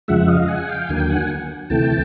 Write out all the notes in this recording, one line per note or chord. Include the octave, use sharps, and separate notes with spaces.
F2 C#3 F3 G#3 E5 F#5
D#5 F5
F#5 G#5
F5 G5
D#2 D3 F#3 A#3 G#5
G5
F#5 G#5
D2 C3 E3 A3 G5 A5